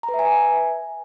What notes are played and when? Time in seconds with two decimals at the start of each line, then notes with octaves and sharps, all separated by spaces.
0.03 A#5
0.09 B4
0.14 E5
0.19 G#5